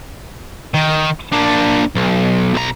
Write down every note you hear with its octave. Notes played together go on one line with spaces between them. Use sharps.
D#3
A#3 D4
B1
B1 A#5